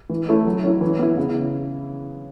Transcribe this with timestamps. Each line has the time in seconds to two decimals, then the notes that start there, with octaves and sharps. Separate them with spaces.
0.10 E3
0.28 A3 C#4 E4
0.45 F#3
0.64 C#4 E4
0.81 E3
0.99 B3 E4
1.17 C#3